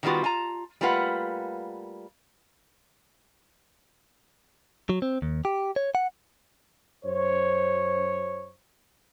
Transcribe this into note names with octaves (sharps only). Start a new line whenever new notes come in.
D#3 F#3 G3 B3 F4 F#4
F4 A5 A#5
G3 A3 A#3 F4 B4 F#5
F#3
C4
D#2
G4
C#5
F#5
F#2 C5 C#5